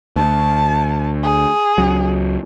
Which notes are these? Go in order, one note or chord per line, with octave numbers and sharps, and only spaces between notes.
D2 A5
G#4
C#2 F#3